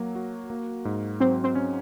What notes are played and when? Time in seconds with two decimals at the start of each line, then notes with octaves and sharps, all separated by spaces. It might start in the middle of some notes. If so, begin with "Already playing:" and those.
Already playing: F#3 A#3
0.15 F#4
0.50 A#3
0.85 G#2
1.20 F#3 C4 C5
1.44 C4 C5
1.55 C#4